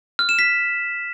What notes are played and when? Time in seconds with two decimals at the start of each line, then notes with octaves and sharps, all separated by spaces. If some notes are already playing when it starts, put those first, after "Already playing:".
0.19 F6
0.29 E7
0.39 B6